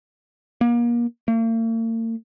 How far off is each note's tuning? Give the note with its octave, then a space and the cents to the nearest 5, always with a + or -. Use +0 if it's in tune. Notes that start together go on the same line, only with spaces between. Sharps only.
A#3 +30
A#3 -45